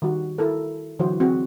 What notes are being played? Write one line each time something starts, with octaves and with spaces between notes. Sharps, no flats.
D#3 G3 F#4
E4 A4 A#4
D3 E3 F#3 E4 F#4 C5
C4 F#4 G#4